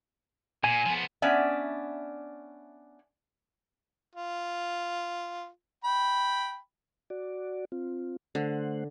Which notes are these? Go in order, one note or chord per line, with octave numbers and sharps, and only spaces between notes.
A#2 G#5
F3 B3
B3 C#4 D4 D5 E5
F4
G5 B5
F#4 D5
C4 F4
D3 A3 C5 F#5